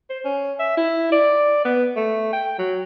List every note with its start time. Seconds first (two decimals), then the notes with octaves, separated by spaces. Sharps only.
0.10 C5
0.25 C#4
0.59 E5
0.77 E4
1.12 D5
1.65 B3
1.96 A3
2.33 G5
2.59 F#3